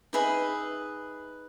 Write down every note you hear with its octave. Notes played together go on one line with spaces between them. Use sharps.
D#4 G#4 B4 D#5 E5